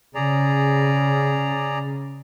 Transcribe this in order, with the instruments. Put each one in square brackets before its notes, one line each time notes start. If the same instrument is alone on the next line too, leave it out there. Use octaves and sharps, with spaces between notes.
[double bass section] C#3 [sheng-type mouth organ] G#4 D5 A#5